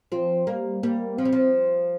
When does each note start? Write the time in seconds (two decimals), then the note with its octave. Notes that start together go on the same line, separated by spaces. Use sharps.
0.12 F3 C4
0.47 G3 A#3
0.83 G3 A#3
1.18 F3 C4
1.25 G3
1.33 F3